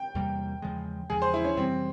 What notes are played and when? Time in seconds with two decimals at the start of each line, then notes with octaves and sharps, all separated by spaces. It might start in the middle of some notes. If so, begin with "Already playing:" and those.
Already playing: G5
0.15 E2 C3 G3 A#3
0.62 E2 C#3 F3 G#3
1.10 E2 C#3 F3 G#3 G#4
1.22 C5
1.34 E4
1.45 C#4
1.57 F2 C3 E3 G3 C4